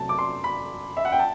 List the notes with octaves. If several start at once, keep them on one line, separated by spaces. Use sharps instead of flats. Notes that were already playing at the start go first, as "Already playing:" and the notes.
Already playing: C3 F#3 A3 A5
D6
C6
B5
E5
F#5
G5
A5